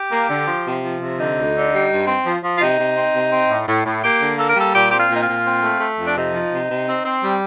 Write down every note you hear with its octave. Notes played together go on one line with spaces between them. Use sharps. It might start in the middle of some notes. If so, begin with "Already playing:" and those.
Already playing: G4
A#3
D3
F3
C3
F3
C3
D3 D#4
D2
D3
G3
G2
C4
F3
F3
F4
C3 D#4
C3
C4
C3
C4
A2
A2
A2
A#3 G4
D3
A#3 A4
A#4
G3 A4
A#2 G4
C4 G4
F4
A#2
D#4
F4
A#2
C4
A3
A3
F2
D4
C3 D#4
F3
C3
C3
C4
C4
G3